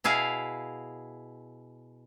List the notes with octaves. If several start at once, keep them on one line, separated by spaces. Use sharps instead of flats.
B2 E4 G#4 F5